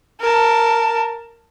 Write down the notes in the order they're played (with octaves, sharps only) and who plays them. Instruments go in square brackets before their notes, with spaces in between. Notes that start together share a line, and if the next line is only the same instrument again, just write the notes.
[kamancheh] A#4 A5